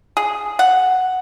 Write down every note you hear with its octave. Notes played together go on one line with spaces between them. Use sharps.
G#4
F#5